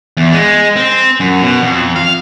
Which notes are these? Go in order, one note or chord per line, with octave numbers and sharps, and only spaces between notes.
E2
G#3
C4
F#2
B2
F2
F5